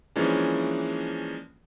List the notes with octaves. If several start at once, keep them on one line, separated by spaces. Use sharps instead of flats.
E3 F3 G#3 A#3 C#4 D4